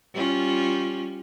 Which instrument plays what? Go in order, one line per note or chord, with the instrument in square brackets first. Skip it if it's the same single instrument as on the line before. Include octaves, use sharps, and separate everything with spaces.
[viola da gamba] G3 C#4 F4